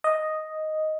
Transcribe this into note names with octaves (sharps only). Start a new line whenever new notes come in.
D#5